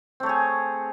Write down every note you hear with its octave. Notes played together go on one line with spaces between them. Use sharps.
A3 C4 G#4 C#5